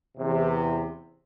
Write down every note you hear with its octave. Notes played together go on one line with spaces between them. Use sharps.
E2 C3